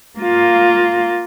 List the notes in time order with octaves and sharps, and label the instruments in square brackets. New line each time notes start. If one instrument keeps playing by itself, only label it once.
[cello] A#3 F4